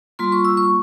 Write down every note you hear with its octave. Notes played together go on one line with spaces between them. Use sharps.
G3 A#3 F4 C6
C#6
E6
C#6